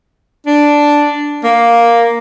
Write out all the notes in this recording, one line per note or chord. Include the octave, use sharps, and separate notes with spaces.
D4
A#3